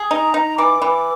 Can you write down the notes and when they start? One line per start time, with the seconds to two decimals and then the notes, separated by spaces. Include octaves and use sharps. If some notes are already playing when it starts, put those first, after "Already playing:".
Already playing: G#4
0.11 D#4 A#5
0.34 D#4
0.58 E3 D6
0.82 E3